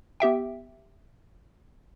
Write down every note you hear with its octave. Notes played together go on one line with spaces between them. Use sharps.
B3 G4 E5 G5